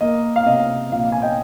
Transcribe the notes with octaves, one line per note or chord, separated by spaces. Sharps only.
A#3 D#5
F5
C3 D#5
A#1 F5
G#5
D#5 G5